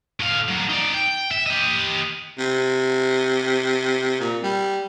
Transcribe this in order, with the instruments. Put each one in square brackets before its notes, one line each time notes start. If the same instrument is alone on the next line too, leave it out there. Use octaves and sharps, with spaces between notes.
[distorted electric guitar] A2 F5
A2 F#3
D#4 D5
G5
E5
G4 D#5
[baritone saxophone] C3
A#2
G3